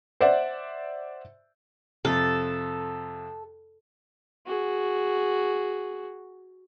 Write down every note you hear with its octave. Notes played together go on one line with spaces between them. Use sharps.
C5 D5 E5 F#5
F2 C3 A4
F#4 G#4